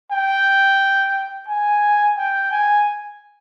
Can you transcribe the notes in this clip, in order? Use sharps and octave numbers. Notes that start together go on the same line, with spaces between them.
G5
G#5
G5
G#5